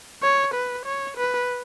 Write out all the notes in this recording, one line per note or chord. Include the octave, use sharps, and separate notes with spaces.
C#5
B4
C#5
B4